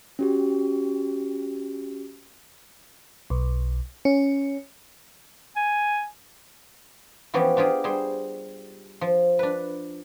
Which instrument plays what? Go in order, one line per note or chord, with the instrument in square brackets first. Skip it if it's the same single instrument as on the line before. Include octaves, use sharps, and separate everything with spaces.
[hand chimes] C#4 F#4 G4
[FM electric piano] B1
C#4
[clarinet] G#5
[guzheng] E3 F3 B3 C#4 G4
D4 F4 G4 G#4
G3 G#4 C5
F3
D4 B4